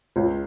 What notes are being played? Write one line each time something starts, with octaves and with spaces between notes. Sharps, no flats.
C#2